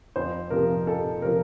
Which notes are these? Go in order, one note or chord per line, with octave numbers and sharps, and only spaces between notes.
F2 C5
C3 F3 C4 A#4
F2 A4
C3 F3 C4 A#4